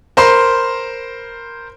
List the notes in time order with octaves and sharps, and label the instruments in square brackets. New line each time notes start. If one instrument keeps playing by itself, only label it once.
[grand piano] A#4 C5 B5 C6